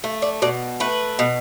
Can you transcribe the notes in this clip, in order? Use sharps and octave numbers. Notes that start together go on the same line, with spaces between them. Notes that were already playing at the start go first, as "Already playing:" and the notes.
A3
D5
B2 D5
A3 B4
B2